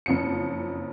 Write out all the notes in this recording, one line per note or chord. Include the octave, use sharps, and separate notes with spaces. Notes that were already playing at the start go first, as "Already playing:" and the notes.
F#1 F2 C#7